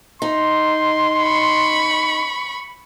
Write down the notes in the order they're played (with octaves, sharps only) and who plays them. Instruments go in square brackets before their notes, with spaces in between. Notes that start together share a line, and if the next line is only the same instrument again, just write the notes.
[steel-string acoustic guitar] D#4 [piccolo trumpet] C6
[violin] B5 C#6